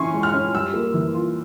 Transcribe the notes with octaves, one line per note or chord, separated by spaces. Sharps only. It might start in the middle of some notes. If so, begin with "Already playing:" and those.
Already playing: E3 C#4 E4 G#5 C6 C#6
G#3
F6
C#4
G3 E6
A#3
E3
F4